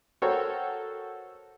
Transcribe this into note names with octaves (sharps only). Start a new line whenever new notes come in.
F#4 A4 A#4 C5 C#5 G5